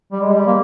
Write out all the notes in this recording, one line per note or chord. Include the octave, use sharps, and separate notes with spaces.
G3
G#3
G3
A#3